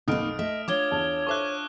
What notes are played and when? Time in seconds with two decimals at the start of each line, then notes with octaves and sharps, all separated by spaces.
0.08 B1 F2 A#3 D#4 D#6 F6 D7
0.39 A3 D#5 E5
0.68 D4 F4 C#5 D6 G#6 G7
0.91 E2 A5
1.27 A4 C5 E5 C#6 D6 F#6